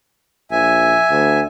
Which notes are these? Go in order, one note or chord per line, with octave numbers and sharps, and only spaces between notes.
A#1 E5 G#5
D2